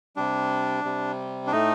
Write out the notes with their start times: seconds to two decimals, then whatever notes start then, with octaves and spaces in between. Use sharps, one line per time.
0.16 C3 G3 D4
0.84 C3 G3
1.47 D4
1.52 A2 A3 D#4